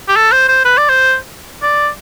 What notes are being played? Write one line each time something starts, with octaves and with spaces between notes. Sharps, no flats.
G4
A4
C5
C5
B4
D5
C5
D5